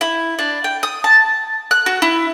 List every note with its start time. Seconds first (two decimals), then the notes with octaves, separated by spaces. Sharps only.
0.01 E4
0.39 D4
0.64 G5
0.83 D#6
1.04 A5
1.71 F#6
1.86 F#4
2.02 E4